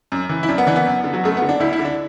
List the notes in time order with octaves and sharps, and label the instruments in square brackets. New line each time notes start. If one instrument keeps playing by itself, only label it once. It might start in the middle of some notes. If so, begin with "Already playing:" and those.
[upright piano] F#2
E3
E4
F#2 D4
B3
E3 D4
B3
F#2
D3
F#3
F#2 A3
D3 B3
D4
D2 E4
E4
D3
D4